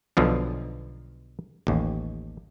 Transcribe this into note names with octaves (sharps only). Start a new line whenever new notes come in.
B1 B2 D3 F3
A1 D#2